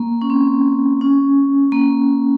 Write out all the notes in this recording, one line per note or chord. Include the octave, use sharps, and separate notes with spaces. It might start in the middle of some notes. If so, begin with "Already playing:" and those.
Already playing: A#3
C#4
C4
C#4
A#3